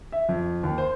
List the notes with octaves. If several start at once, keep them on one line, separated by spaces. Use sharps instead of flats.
E5
F2
D#2
C5